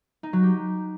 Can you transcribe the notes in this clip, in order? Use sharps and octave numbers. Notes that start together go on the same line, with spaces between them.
D#4
F#3
G4